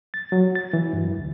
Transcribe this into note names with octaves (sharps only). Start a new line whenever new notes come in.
A6
F#3
A6
E3
G2
F#2
D2